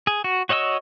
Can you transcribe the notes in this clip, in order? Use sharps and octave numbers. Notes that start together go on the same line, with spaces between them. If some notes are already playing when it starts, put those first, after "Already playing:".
G#4
F#4
F#4 C#5 D#5 F#5 E6